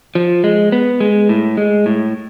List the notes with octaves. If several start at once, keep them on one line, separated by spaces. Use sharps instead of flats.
F3
G#3
B3
G#3
A2
G#3
A2